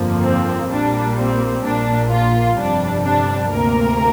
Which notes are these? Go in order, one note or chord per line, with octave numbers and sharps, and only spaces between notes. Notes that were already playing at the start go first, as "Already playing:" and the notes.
Already playing: G1 F2 D3 F3 A#3
C4
A#1 A#2 G3 A#3 D4
C4
A#1 A#2 A#3 D4
F4
G1 F2 C3 G3 D4
D4
D2 C3 A#3 A#4